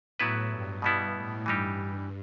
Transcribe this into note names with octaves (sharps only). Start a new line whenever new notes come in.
A2 F#3 B3 E4 B4
G2
B2 G3 B3 E4
A2
G2 E3 G3 D#4 G4